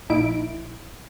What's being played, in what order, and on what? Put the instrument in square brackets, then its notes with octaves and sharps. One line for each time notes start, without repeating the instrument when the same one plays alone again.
[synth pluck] A#1 D#4 E4 D7